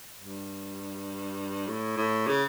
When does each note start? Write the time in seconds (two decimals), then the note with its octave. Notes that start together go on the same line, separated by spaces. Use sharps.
0.19 G2
1.67 A2
1.97 A2
2.27 C#3